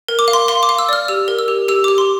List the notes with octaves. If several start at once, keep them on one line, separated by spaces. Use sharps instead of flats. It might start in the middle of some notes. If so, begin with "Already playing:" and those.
A#4
D6
F5
C6
F5 C6
D6
F5
E6
D5 F6
G4 E6
A#4
E6
G4
G4 E6
G4 D6
C6